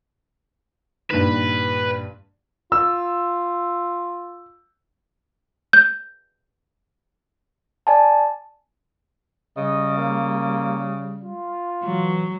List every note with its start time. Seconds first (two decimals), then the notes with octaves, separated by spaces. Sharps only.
1.11 G2 A#2 D#3 B4
2.72 F4 E6
5.73 G6
7.87 D5 G#5 A5
9.57 C#3 G3 D#5
9.98 A#3
11.23 F4
11.84 E3 F#3